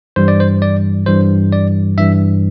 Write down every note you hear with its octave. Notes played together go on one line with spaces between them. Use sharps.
G2 E3 G3 C5
D5
C5
D5
G2 E3 G3 C5
D5
G2 E3 G3 E5